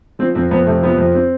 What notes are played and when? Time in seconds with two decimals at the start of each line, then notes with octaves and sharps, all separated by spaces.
0.19 F3 C4
0.35 F2 C4
0.51 F2 B3
0.66 C3 A3
0.83 F3 B3
0.98 F2
1.15 C4